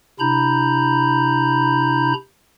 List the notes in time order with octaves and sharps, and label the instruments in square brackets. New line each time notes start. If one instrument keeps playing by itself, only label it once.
[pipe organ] C3 D4 E4 A#5 B5 G6